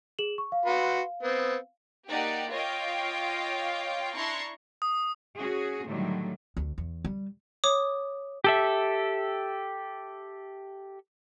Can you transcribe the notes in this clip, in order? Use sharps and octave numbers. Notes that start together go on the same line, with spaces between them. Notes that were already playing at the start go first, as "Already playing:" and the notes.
G#4 E7 F#7
C#6
F5
F#4 B4 C6
B3 C4
A#3 D#4 G4 D5 F#5
F4 C#5 D#5 F5 G5 D6
D4 E4 A#5 C6 C#6
D#6
C#4 F#4 G#4
A2 D3 D#3 F#3 G3 A3
D2
E2
G3
C#5 D6 D#6
G4 A4 E5